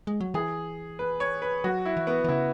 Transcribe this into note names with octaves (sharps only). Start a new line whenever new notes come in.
G#3
F#3
E3 G#4
B4
C#5
B4
F#3 F#4
E4
E3
B3
E3
C#3 E4